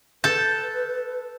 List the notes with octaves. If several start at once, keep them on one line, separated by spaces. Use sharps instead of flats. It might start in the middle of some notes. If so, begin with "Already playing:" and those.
A4 B4 A5 G6